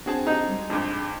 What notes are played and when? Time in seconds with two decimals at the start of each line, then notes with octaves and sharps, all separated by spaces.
0.06 C4 D4 F#4 G#4 A5
0.27 D#4 G4 A4
0.47 G3 G#3
0.70 F2 G#2 D4